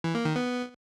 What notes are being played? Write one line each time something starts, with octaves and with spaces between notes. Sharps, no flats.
E3
A#3
D#3
B3